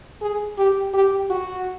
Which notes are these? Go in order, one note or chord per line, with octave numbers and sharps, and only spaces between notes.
G#4
G4
G4
F#4